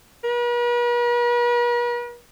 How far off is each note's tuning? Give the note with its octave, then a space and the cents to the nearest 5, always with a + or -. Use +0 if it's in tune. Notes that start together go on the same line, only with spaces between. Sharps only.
B4 -45